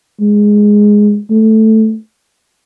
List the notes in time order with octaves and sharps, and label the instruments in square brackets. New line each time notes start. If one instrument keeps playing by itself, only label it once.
[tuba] G#3
A3